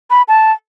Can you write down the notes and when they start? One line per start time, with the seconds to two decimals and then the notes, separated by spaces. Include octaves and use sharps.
0.10 B5
0.28 A5